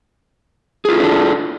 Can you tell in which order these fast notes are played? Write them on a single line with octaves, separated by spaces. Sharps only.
G#4 F4 E4 A4 D4